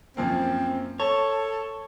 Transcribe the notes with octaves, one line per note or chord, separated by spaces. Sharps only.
F#2 F3 A#3 C4
A4 C#5 A5